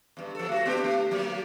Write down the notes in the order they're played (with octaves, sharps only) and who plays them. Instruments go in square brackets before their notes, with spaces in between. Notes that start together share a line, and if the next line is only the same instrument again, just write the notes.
[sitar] E2 G2
F3 A4
A3 F#4
B3 D4 G4
A3
F#3 G3 A#3